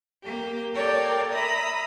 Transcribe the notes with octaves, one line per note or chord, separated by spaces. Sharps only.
A#3 G4
A4 A#4 C#5 D5 F5 G5
E5 A#5 B5 D#6